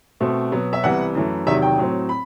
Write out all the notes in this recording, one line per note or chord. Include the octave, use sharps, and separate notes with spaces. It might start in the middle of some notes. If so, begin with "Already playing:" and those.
B2 A3 C4
B2 F#3 B3
E5
C2 C3 E3 B3 F#5
F#2 E3 A3
E2 C3 D#3 F#3 E5
G5
A2 F#3 C4
B5